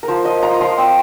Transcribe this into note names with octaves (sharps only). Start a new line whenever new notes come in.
A#4
F3 C5
F3 D#5
F3 A#5
F3 C6
C4 G5